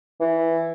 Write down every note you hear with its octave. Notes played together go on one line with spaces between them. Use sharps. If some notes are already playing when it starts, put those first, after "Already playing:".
E3